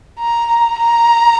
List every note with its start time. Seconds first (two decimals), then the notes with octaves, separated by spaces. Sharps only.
0.19 A#5
0.78 A#5